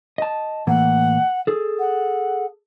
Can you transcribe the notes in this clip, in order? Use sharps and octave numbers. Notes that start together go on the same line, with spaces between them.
D#5 A5
A2 E3 A#3 F#5
G#4 A4
F#5